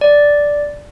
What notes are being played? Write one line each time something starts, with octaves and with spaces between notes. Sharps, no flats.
D5